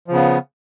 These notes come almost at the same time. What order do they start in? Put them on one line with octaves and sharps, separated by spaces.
F3 C#3 B3